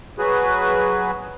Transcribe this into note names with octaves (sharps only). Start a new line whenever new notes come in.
F#3 F#4 G#4 B4